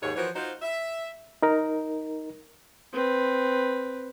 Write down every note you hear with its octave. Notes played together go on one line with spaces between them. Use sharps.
D#2 G#2 C#5
E3 F3 F#4 A#4 C5 C#5
D#4 F4 F#4 C5
E5
D#4 A#4
C4 B4